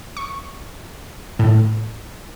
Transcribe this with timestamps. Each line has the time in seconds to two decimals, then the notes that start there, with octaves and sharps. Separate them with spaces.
0.17 C#6
1.39 A2